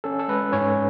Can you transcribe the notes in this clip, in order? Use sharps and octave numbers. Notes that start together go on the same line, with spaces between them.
C#4 A4
A4
G#3 B4
G#2 C#4 C#5